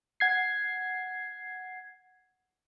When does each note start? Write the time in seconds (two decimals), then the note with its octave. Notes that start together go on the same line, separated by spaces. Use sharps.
0.20 F#5 G#6 C7